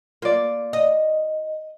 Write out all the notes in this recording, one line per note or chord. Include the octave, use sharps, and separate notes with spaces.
A#3 F4 D5
D#5